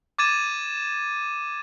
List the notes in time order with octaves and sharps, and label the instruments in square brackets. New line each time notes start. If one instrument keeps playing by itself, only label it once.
[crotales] D6 G#6 A6 D#7 E7